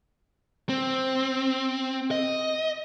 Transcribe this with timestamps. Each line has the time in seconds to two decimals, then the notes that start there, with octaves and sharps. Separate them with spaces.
0.69 C4
2.11 D#5